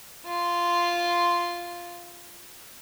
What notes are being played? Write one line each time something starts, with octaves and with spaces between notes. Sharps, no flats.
F4 C6